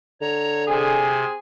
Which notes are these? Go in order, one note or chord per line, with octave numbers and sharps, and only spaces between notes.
D3 C#5 A#5
C3 C4 G#4